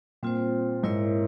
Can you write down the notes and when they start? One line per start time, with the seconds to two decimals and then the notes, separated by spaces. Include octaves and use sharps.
0.23 A#2 G3 C4 F4 C5
0.83 G#2 E4 A#4 C#5 E5